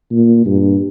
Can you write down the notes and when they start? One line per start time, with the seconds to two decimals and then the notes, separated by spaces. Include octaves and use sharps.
0.12 A#2
0.46 G2